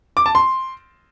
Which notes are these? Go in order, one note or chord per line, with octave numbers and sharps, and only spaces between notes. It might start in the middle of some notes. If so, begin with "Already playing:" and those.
D6
A5
C6